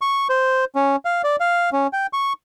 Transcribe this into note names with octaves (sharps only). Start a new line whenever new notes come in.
C#6
C5
C#4
F5
D5
F5
C#4
G5
C#6